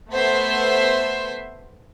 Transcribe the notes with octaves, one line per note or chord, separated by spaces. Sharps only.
A3 B3 C5 E5 C6